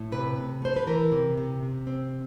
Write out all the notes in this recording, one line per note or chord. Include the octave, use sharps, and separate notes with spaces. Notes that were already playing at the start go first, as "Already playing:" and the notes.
Already playing: A2
C3 B4
C3
A3 C5
B4
E3 A#4
C3
C3
C3
C4